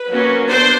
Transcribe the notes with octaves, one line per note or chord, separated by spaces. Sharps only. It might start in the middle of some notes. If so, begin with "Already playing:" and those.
Already playing: B4
F#3 A#3 C#4
B3 D4 C5